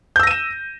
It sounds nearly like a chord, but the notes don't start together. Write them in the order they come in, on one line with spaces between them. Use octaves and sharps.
G6 E6 A#6 D#7 E7